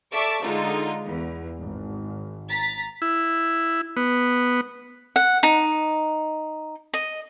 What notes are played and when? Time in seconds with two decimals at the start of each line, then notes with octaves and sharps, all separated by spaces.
0.13 A4 D5 E5 A5 C#6 D6
0.42 D3 G#3 D#4 F4
1.04 E2
1.59 G#1
2.48 A#5 A6 B6
3.02 E4
3.97 B3
5.16 F#5
5.43 D#4
6.94 D#5